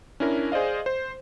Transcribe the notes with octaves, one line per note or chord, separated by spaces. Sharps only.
C#4 D4 E4 A#4
G#4 C5 D5 D#5 F5
C5